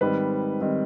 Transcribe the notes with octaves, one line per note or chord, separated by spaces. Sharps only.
G#2 D#3 G3 C4 B4
D#3 G3 C4